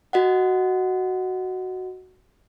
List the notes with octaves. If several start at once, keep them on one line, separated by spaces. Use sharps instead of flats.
F#4 D#5 F#5